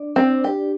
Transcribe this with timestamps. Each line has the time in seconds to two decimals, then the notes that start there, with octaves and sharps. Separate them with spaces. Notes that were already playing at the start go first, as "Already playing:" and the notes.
Already playing: D4 D5
0.16 C4
0.30 D4 D5
0.44 G4